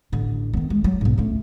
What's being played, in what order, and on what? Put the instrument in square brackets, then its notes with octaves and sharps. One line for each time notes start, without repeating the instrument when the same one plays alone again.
[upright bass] A1 D3
D#3 B3
G#3
F#3
B1 G#2
C#2 A3